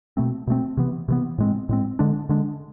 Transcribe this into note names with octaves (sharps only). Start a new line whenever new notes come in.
B2 A3 C4
B2 A3 C4
C3 E3 B3
C3 E3 B3
A2 G#3 C4
A2 G#3 C4
D3 G#3 D4
D3 G#3 D4